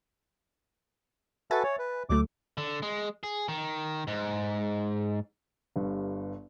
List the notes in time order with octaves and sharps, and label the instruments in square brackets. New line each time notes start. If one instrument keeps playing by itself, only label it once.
[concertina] F#4 A4 B4 [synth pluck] E5 G#5 A6
[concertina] C#5
B4
[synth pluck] D2 F#3 A3 [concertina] D6
[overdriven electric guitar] D3
G#3
G#4
D#3
G#2
[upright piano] G1 G2